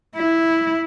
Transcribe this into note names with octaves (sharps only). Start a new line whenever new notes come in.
E4